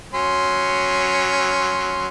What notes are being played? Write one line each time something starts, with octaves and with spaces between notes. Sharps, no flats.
F#3 C#4 C6